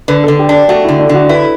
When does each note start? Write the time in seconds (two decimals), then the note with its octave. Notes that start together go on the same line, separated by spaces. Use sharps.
0.08 D3 B4
0.24 A4
0.28 D3
0.39 G4
0.49 D4 A4
0.69 A3 F#4
0.84 E4
0.89 D3
0.99 D4
1.09 D3 F#4
1.29 E4 B4